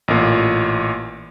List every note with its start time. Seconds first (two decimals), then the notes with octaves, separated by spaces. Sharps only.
0.08 A1 A#2